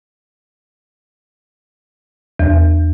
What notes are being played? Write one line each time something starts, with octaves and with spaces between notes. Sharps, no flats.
E2